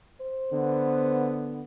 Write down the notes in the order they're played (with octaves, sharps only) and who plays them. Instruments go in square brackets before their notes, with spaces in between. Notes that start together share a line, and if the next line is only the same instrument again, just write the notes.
[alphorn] C5
[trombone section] D3 B3